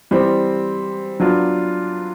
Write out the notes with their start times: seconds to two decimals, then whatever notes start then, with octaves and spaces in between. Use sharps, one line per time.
0.11 E3 G3 C4
1.20 F#3 B3 D4 F4